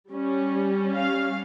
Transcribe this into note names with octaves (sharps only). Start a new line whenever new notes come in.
G3 C#4
F5